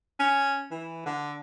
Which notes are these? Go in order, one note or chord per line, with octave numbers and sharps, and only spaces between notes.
C#4
E3
D3